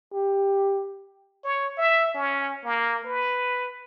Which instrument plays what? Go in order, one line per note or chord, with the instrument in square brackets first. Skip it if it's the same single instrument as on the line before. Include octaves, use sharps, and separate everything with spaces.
[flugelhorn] G4
[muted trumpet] C#5
E5
C#4
A#3
B4